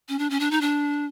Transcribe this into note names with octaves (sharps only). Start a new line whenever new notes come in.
C#4
D4
C#4
D4
D#4
D4